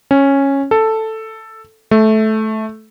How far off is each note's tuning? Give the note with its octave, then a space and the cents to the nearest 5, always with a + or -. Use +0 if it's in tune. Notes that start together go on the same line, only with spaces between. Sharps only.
C#4 -10
A4 +5
A3 -15